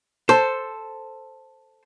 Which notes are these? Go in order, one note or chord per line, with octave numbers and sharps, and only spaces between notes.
A4 C5